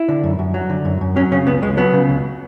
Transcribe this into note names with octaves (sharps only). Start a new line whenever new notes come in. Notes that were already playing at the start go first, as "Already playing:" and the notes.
Already playing: E4
D3
F#2
F#2
F#3
D3
F#2
F#2
F#3 C#4
C#3 C#4
C#2 B3
C#2 G#3
F#3 B3
C#3
C#2